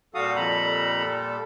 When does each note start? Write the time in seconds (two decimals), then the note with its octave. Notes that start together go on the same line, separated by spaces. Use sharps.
0.15 A#2 G3 F#4 A4 F5 D#6
0.36 F2 A#5 B5